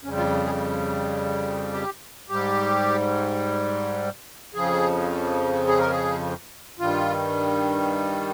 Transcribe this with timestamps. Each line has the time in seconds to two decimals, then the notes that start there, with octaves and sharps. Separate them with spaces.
0.04 F2 C#3 G3 C#4
0.17 F4
0.46 G#4
1.73 G4
2.29 G#2 G3 G4
4.54 F2 C#3 F3 G#4
5.67 G#4
5.79 A#4
5.90 G#4
6.79 G2 D#3 G3 F4